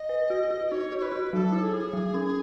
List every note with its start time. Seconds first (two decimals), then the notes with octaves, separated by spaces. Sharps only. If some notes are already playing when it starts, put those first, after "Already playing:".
Already playing: D#5
0.09 B4
0.30 F#4
0.51 F#4
0.67 D#5
0.71 D#4 C#5
0.92 F#4
0.98 C#5
1.02 B4
1.12 F#4
1.33 F#3 A4
1.52 E4
1.63 G#4
1.74 E4
1.93 F#3
2.14 C#4